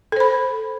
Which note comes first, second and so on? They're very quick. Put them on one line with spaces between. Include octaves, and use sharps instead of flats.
A4 C5 B5